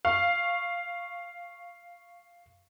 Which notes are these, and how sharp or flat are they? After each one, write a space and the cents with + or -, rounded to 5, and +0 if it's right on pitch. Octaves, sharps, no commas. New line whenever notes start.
F5 +0 C#6 +0